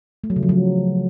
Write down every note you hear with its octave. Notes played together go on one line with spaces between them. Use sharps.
A3
F#3
C#3
F3
F#3